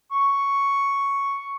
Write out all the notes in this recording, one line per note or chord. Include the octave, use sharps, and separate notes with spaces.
C#6